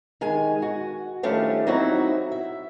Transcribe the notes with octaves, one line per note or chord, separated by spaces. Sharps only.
D#3 G#3 G#5
F#4
D#3 F3 G3 A3 C#4 D4
F#3 C4 D#4 E4 F#4
E5